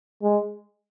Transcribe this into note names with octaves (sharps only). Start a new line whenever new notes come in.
G#3